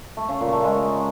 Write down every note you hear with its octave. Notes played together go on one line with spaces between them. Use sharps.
A3
C#3
A#2
A3
G#3